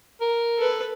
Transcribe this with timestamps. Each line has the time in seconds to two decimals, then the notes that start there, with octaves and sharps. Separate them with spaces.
0.21 A#4
0.58 A4 B4